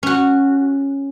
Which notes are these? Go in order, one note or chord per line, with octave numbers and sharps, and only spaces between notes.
C#4 F#4